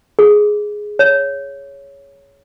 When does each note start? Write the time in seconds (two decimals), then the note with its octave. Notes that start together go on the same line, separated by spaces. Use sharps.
0.19 G#4
0.99 C#5